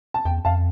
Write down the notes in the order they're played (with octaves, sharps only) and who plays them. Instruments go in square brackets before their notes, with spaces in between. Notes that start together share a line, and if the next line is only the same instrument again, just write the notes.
[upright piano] A5
[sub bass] E2 [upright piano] G5
[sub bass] F2 [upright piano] F5 A5